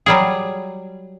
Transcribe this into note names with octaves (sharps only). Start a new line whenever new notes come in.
F#3 G3 G#4